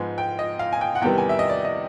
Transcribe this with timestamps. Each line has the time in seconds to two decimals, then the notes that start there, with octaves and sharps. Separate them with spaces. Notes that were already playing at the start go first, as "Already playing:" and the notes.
Already playing: G#2 F3 G#3 B3 G#5
0.18 G5
0.39 D#5
0.59 F5
0.73 G#5
0.81 G5
0.95 F#5
1.01 E2 C3 D#3 G3 B3 G5
1.18 G#5
1.29 E5
1.39 D#5
1.49 D5
1.65 D#5